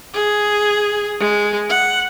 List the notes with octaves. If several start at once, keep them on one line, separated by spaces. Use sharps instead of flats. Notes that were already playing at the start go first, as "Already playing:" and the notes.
G#4
G#3
F#5